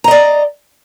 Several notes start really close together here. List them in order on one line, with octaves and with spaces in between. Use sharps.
A#5 D#5 D5